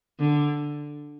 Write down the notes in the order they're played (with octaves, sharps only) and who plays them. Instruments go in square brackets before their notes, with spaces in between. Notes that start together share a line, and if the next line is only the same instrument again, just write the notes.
[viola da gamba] D3